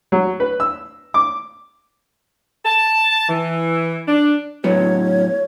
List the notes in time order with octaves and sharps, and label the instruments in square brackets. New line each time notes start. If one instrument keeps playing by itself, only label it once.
[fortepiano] F#3
B4
E6
D6
[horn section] A5
E3
D4
[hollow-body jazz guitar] A2 F#3 B3 [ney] C#5